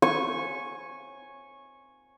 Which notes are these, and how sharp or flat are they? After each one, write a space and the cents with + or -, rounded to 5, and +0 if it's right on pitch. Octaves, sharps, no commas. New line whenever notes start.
G#5 +0 C#6 -15